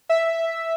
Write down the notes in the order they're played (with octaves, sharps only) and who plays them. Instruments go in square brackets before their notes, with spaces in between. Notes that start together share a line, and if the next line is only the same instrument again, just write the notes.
[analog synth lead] E5